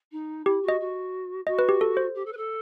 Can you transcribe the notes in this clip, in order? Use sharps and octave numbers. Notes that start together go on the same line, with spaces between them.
D#4
E4 G4
F#4
D#5
F#4
F#4 D#5
B4
G4
A4
C5
G4
A4
B4
A4